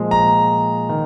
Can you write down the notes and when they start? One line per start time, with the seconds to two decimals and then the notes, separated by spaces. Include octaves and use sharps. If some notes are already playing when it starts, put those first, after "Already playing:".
Already playing: A#2 F3 G#3
0.11 A#5
0.89 D#3